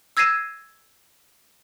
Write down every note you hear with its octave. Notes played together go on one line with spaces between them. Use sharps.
E6 G#6 A#6 C7 D#7 E7